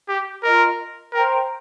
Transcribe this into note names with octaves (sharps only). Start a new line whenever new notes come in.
G4
F4 A#4 D#5 A#5
A#4 C5 G5 A#5